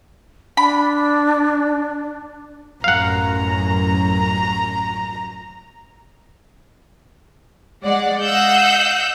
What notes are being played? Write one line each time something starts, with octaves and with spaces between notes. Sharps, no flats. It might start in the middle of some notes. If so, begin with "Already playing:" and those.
D4 B5
A1 F#2 F5 F#5 A#5
G#3 D5 F#5
D#5 F5 F#5 E6 F#6 G6